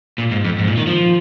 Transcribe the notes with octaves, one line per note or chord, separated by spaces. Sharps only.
A#2
G#2
F2
G#2
A#2
D#3
F3